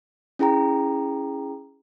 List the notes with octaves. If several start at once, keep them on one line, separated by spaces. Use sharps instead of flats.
C#4 E4 G#4 G5 A#5